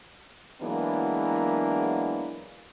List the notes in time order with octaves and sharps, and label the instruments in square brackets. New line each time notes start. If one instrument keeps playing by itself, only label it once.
[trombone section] E3 F#3 G#3 A#3 B3 D4